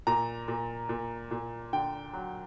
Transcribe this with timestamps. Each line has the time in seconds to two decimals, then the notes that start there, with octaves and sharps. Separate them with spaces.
0.07 A#2 A#5
0.48 A#2
0.89 A#2
1.31 A#2
1.73 D3 G5
2.13 F#3